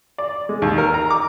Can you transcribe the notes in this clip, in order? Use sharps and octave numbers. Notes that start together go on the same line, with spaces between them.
D5
G#3
D#2
A#4
A#5
D6